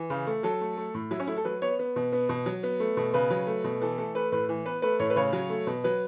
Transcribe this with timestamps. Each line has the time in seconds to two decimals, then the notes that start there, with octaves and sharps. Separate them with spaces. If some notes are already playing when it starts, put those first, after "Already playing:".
Already playing: E3
0.10 C#3
0.27 A3
0.43 F#3 A4
0.61 A3
0.77 A3
0.94 A2
1.11 F#3 E4
1.20 C#4
1.27 A3 E4
1.36 A4
1.45 F#3 B4
1.62 B3 C#5
1.79 B3
1.96 B2
2.12 B3
2.29 B2
2.46 F#3
2.63 B3
2.80 A3
2.97 B2
3.13 C#3 B4
3.30 F#3
3.47 A3
3.64 B2
3.81 E3 A4
3.98 A3 A4
4.15 A3 B4
4.32 A2 B4
4.49 E3
4.66 B3 B4
4.82 A3 B4
4.99 A2 C#5
5.10 B4
5.16 C#3 C#5
5.33 F#3
5.50 A3
5.67 B2
5.84 F#3 B4